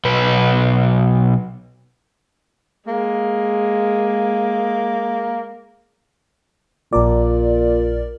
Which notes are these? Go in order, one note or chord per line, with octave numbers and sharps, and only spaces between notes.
B1 B4
G#3 A#3
A#1 A#2 A#4 D5